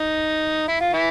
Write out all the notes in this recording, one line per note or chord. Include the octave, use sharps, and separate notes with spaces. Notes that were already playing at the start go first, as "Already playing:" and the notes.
Already playing: D#4
E4
F4
E3 E4